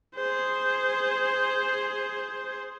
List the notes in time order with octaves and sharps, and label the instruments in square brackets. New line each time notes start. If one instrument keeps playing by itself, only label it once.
[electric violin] G#4 C5